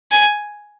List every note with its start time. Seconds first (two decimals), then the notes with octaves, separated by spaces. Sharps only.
0.11 G#5